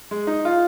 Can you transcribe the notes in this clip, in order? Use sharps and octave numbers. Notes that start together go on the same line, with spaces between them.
G#3
D#4
F4